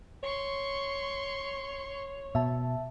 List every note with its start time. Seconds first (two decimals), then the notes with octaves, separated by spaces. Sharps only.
0.23 C#5 C6 C#6
2.35 B2 E5 A5